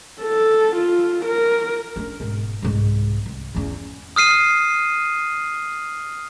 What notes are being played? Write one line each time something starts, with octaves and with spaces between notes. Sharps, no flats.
A4
F4
A#4
C#4 D4
E1 G#2
C2 G#2
C2
E2 C#4
D#6 F6 C7 D#7